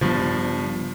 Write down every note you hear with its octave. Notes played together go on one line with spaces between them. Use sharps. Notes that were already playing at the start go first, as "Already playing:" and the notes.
G2 C#3 F3 G3 B3